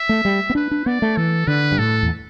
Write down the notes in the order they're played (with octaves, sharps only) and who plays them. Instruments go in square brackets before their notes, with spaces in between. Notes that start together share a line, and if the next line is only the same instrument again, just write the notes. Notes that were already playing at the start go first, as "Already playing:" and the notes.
Already playing: [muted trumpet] E5
[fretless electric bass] A3
G3
B3
[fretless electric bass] D4 [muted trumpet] B4
[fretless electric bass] D4
[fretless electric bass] B3 [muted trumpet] D5
[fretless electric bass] A3
[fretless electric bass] E3 [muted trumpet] A4
[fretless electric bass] D3 [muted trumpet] B4
[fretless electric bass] G2
[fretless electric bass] A2 [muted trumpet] A4
[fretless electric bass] E2